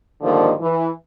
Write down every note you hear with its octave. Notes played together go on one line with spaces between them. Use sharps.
G#2 D3 D#3 F3 G3 A#3
E3